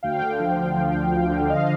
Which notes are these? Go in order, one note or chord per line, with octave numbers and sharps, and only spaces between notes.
D2 F5 G5
D3
F3
D2
F3
D2
D2
D3
F3 D#5 F5